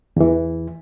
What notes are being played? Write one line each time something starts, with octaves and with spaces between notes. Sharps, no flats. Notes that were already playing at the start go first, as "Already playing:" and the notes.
E2 E3